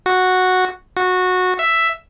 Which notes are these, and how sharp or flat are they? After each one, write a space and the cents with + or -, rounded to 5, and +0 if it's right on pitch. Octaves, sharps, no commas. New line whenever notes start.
F#4 -5
F#4 -15
E5 +5